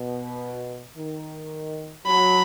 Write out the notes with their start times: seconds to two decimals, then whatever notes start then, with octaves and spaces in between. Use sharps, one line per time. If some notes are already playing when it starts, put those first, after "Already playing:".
Already playing: B2
0.96 D#3
2.06 F#3 B5